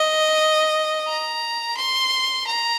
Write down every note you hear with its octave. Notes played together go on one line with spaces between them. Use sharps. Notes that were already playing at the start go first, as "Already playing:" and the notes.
Already playing: D#5
A#5
C6
A#5